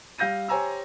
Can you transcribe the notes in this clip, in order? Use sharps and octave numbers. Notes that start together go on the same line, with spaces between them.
G3 F5 G6 A#6 D#7
G4 C5 C#5 G#5 A#5 E6